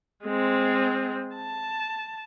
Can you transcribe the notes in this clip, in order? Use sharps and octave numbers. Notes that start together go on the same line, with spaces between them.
G#3 C4
A5